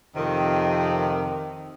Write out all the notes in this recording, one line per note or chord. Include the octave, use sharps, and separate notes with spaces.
F2 C3 D#3